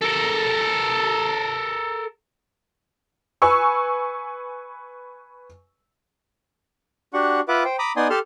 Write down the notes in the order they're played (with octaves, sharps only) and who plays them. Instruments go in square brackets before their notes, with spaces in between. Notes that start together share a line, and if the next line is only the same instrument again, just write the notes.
[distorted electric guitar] A4 A#4
[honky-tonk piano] B4 G#5 C#6 E6
[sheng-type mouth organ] D4 F#4 G4 F#5 C#6
F4 B4 E5 F#5 D6
C5 G5
A#5 B5 D6 D#6
B3 D#4 D5 G#5 C6 D#6
G4 A4 A5 C6 F6